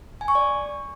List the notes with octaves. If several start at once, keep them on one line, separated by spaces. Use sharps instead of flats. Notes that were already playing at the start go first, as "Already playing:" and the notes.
G#5
C#6
D5